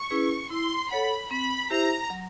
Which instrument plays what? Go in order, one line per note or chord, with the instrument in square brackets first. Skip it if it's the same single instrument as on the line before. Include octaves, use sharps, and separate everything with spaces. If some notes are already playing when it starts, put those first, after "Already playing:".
Already playing: [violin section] C#6
[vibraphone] C#4 E4 G#4 B4
[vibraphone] E4 [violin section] C6
[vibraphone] A4 C#5 F#5 [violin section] B5
[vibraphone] C4 [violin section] B5
[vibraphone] E4 G4 C5 E5 [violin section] A#5
[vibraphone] F#3